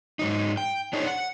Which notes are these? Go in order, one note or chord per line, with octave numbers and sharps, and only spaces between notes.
G#2 F#3 D#4
G5
D4 D#4 G#4 C5 C#5 D#5
F#5